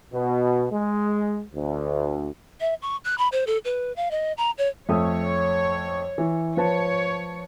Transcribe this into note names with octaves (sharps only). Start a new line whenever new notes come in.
B2
G#3
D2
E5
C#6
F#6
B5
C5
A4
B4
F5
D#5
A#5
C#5
F2 A3 C#5 D#6
E3
F3 B4 C#5 A5